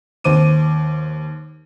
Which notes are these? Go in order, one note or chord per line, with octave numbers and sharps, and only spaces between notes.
D#2 C5 D6 D#7